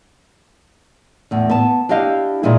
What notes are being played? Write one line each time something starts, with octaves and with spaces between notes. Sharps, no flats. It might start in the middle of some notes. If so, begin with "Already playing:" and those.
E2 A2
B3 A5
D4 E4 G4 D#5 F5
A#2 E3 G#3 E4 G#4